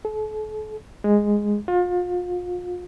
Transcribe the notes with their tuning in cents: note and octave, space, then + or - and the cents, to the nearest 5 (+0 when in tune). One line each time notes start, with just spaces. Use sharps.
A4 -40
G#3 -5
F4 +35